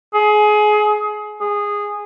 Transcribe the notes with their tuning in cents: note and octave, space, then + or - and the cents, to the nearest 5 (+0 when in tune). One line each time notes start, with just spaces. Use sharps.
G#4 +25
G#4 -10